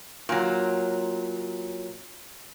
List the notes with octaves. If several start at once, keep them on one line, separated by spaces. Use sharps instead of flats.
A#2 F#3